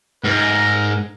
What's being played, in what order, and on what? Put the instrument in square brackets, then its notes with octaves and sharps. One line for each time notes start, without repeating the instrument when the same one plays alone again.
[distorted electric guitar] G#2 [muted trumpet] A#4